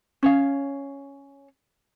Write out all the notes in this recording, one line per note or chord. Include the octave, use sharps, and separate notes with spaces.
C#4 C#5 F5